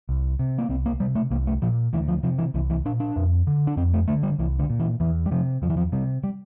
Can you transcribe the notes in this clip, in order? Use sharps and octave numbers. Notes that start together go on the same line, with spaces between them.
C2
C3
A#3
C2 C4
A#3
C3 G3
A3
C2 A#3
A3
A#2 F3
D2 E3
F3
C3 F3
E3
C2 E3
E3
A#2 D4
D4
F2
D3
D4
F2 C4
A3
D3 A3
G3
C2 E3
D3
A#2
E3
E2 E3
G3
C3 F3
E2 F3
E3
F3
C3 G3
G3